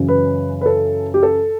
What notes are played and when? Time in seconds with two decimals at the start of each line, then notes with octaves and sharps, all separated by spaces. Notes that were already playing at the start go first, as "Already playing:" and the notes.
Already playing: F#2 C#3 E3
0.09 B4
0.61 B4
0.66 A4
1.14 G4
1.23 A4